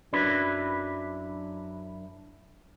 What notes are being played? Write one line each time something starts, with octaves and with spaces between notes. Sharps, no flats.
F#2 F#3 D4 E4 B4